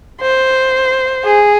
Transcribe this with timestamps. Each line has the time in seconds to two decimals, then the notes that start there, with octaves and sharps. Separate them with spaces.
0.21 C5
1.25 G#4